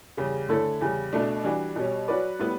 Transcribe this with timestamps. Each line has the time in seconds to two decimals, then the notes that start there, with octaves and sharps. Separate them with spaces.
0.17 E2 C#3 G3
0.49 D3 A3 E4 A4 C#5
0.81 E2 C#3 G3
1.13 B2 A3 D4
1.44 E3 G3 D4 F#4
1.76 B2 G3 C#4
2.08 F#3 C#4 F#4 B4 D5
2.40 A2 G3 B3 E4